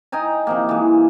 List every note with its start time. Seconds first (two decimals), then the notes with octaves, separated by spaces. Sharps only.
0.12 D#4 G5 G#5 A#5
0.47 C3 F3 A#3
0.69 E3 G#3